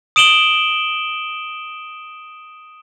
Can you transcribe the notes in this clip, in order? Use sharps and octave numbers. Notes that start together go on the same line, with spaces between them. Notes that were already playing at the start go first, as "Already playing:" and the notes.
D#6 D7 E7 F#7 G7